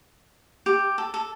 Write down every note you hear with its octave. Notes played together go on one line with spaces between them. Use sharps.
G4
A4
A4